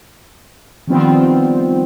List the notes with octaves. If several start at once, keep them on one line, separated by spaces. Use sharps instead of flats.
D#3 F3 G3 B3 C4 F4